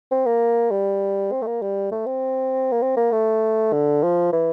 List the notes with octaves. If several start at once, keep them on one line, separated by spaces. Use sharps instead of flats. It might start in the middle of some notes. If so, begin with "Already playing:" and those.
C4
A#3
G3
C4
A3
A#3
G3
A3
C4
A#3
C4
A#3
A3
D3
F3
E3